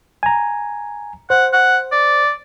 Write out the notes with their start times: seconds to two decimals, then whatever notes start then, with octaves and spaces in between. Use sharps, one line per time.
0.23 G#5 A#5
1.30 C5 F#5
1.53 F#5
1.92 D5